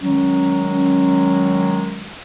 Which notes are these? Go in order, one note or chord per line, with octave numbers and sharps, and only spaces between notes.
D#3 F#3 G#3 C#4